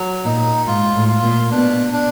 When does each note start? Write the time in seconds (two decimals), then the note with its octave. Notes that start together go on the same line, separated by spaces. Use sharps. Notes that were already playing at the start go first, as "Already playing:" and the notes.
Already playing: F#3
0.25 A#2 D#4
0.66 G#2 F4
0.94 A2
1.08 F4
1.23 A#2
1.51 B2 D4
1.93 D4